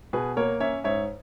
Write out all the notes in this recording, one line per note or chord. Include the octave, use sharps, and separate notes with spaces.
B2 G#4 B4
A#3 A#4 C#5
C#4 C#5 E5
G#2 C#5 E5